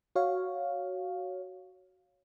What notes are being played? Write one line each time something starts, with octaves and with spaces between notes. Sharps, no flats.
F#4 C#5 F5